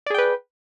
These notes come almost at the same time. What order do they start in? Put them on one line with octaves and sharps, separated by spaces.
D5 G#4 G5 B4